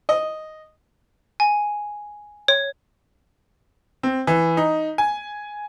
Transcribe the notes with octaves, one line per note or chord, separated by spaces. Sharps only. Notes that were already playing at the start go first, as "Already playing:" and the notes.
D#5
G#5
C#5
C4
E3
D#4
G#5